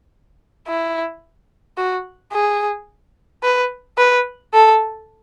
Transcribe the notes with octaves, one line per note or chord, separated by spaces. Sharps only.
E4
F#4
G#4
B4
B4
A4